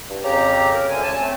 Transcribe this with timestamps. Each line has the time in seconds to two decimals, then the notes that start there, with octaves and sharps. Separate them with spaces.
0.10 G2
0.24 F2 C#3 G4 A#5
0.73 A#4
0.88 D2 D3 G#5
1.03 C#4 G#5 A5
1.20 A3 C4